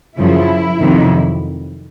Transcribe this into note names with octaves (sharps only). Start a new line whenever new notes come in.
F#2 C#3 F3 E4
F2 C3 D#3 F#3